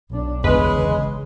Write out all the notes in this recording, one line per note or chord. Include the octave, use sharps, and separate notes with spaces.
B1 D4
G1 E2 C#3 G#3 B4